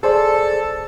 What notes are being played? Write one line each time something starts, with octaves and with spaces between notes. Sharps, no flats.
G#4 A4 C5 D5